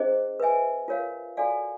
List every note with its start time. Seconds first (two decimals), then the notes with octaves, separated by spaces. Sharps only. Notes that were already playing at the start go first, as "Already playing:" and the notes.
Already playing: C#4 E4 G#4 C5 D#5
0.40 B4 E5 G#5
0.88 F4 A#4 C#5 F5
1.37 F#4 A4 D5 F5 G#5